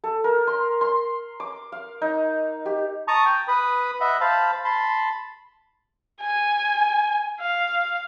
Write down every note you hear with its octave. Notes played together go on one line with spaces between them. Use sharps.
A4
A#4
C6
C6
D6
F5
D#4
G4
A5 A#5 C#6 D#6
G5
B4 B5 D#6
D#5 E5 F#5 B5
C5 F5 A5 B5
A5 B5 C6
G#5
F5